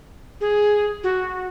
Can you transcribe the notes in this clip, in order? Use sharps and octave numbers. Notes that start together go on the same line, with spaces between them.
G#4
F#4